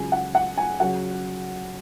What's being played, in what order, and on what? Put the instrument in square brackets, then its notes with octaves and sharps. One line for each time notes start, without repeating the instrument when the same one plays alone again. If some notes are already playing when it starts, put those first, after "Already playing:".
Already playing: [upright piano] C#2 C#3 F#3 G#5
F#5
F#5
G#5
C#3 F#3 F#5